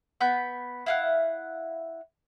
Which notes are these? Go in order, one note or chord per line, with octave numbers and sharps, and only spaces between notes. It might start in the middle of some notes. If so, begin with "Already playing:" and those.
B3 B5 G6
E4 F5 F#5